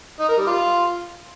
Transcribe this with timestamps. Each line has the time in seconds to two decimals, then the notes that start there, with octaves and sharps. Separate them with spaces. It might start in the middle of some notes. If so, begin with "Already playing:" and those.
0.19 D#4
0.28 A#4
0.38 G3
0.47 F4